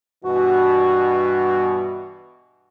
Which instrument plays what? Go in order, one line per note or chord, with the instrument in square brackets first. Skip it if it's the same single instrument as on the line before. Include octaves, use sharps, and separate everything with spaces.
[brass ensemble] G2 B2 E3 [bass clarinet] F#4